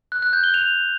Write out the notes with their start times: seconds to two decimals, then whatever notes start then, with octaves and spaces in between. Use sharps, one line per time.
0.12 F#6
0.22 F#6
0.33 G6
0.44 G7
0.54 F7